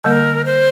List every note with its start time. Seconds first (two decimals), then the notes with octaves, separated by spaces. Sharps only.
0.04 D3 G3 A#3 A#4
0.45 C5